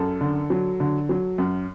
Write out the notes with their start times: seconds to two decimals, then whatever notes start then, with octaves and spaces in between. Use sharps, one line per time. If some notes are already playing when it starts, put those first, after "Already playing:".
Already playing: F#2 A4
0.21 D3
0.50 F#3
0.80 D3
1.09 F#3
1.38 F#2